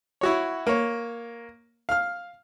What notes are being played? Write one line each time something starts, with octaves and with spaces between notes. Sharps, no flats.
E4 F#4 C#5
A#3 C#5
F5 F6